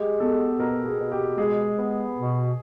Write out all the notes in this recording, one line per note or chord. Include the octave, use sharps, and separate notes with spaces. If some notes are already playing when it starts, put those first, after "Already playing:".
Already playing: G#3 G4
B3 A4
B2 A#4
G#4
B2
G4
G#3 G#4
B3
B2